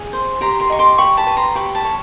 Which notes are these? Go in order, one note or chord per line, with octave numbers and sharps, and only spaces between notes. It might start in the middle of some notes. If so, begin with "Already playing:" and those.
Already playing: G#4
C5
G4 A#5 C6
A#5 C6
D#5 C#6
C6 D6
G4 B5 C#6
A5 B5
B4
A#5 C6
G4 B5 C#6
A5 B5
C#5